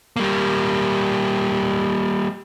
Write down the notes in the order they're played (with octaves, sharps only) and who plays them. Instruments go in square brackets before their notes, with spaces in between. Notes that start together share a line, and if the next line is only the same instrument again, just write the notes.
[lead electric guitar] G3 A#3